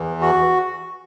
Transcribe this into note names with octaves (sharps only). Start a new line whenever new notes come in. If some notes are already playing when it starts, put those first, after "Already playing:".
Already playing: E2 E3
F#4